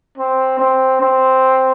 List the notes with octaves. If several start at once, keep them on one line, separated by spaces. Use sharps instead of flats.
C4
C4
C4